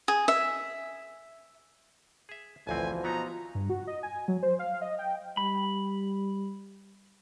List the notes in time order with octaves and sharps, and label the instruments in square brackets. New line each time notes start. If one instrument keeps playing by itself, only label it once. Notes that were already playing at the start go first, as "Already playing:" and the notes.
[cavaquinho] G#4
E5
[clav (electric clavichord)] G#4 E5
[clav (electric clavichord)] A1 D2 C4 [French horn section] B2 F3 [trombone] E3 [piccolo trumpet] G#5
[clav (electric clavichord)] F#3 B3 D#4 [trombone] F4 [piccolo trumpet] A#5
[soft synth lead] G2
F#4
D#5
G#5
F#3
C5
F5
D#5
G5
[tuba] G3 [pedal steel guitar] B5